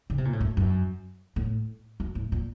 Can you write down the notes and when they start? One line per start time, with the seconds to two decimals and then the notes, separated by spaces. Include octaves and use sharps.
0.10 C#3
0.18 C3
0.25 A#2
0.33 A2
0.40 F#2
0.57 F#2
1.36 A2
2.00 F#2
2.15 A2
2.32 A#2